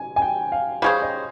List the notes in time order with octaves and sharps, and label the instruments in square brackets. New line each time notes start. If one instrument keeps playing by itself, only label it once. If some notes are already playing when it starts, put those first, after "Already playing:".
Already playing: [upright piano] G#5
G#5
G5
F5
[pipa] G3 C#4 G#4 C5 [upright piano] F5
[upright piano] D#5